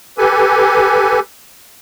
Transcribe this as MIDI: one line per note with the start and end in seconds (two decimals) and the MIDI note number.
0.18 1.20 67
0.18 1.20 69
0.18 1.20 71
0.18 1.20 80